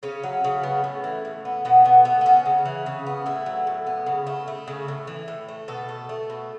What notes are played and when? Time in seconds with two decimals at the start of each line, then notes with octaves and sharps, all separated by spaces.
0.03 C#3 C#4
0.24 F#3
0.44 C#3
0.63 B3
0.84 A2
1.04 E3
1.25 A2
1.45 B3
1.65 B2 B3
1.85 A3 B3
2.05 A3 B3
2.21 B3
2.26 B2 C#4
2.46 C#3
2.66 E3
2.86 C#3
3.06 B3
3.26 A2 E4
3.46 F#3
3.67 A2
3.87 B3
4.06 C#3
4.27 A3
4.48 A3
4.68 C#3
4.88 A2
5.07 E3
5.28 A2
5.49 A3
5.68 B2 A4
5.89 A3
6.09 A3
6.30 B2